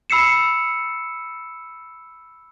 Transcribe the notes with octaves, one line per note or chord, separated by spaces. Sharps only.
B5 E6 C7 C#7 E7